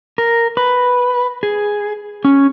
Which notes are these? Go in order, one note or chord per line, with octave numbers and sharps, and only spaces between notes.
A#4
B4
G#4
C#4